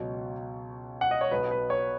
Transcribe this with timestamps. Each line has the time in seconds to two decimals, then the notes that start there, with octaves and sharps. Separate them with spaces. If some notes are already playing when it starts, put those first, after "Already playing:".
Already playing: C#2 B2 F#3
1.01 F#5
1.11 D#5
1.21 C#5
1.31 B1 B2 B3 B4
1.51 B4
1.70 C#5